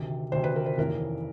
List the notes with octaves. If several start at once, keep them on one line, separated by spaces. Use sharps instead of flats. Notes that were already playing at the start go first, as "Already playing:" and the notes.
Already playing: D2 C3 D#3
D2 C3 D#3 C5
B4
A#4
C5
F1 D#2 C#3 E3 A#4